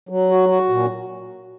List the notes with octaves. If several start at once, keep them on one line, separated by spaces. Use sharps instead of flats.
F#3
F#4
F#4
A#2